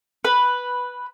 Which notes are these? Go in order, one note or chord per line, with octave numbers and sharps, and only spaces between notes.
B4